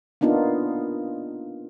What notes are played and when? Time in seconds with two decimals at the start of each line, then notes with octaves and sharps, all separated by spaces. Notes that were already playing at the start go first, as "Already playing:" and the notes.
0.21 A#3 B3 D4 D#4 F4